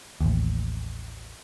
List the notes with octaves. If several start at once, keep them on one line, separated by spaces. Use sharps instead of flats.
A1 D#2